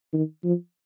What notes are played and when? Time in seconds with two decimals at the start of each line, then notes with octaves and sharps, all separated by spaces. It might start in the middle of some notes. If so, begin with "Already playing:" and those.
0.13 D#3
0.44 F3